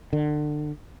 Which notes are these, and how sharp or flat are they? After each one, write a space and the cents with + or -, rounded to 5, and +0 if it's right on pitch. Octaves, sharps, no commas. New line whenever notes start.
D3 +30